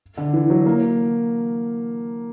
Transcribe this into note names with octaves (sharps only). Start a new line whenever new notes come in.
D3
E3
F#3
A#3